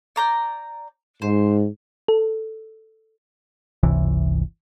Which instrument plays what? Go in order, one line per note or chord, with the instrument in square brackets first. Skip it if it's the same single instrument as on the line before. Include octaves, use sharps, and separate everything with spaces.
[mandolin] D5 A#5 G6
[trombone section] G#2 [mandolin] C5
[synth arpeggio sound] A4
[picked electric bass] G1 C#2 C3 E3